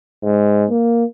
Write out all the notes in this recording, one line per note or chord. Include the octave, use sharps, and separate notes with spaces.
G#2
A#3